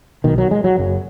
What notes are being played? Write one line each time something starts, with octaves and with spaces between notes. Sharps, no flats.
B1 B2 D#3
F#3
G#3
F#3
F#1 F#2 C#3